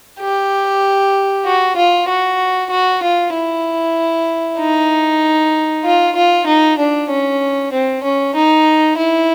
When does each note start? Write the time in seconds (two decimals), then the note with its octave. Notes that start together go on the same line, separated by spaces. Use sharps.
0.20 G4
1.45 F#4
1.76 F4
2.08 F#4
2.70 F#4
3.03 F4
3.34 E4
4.59 D#4
5.84 F4
6.15 F4
6.46 D#4
6.78 D4
7.09 C#4
7.72 C4
8.03 C#4
8.35 D#4
8.97 E4